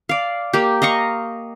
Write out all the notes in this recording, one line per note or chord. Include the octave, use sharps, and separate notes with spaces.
D5 F5
A#3 G4
D#5 F5 A#5 C#6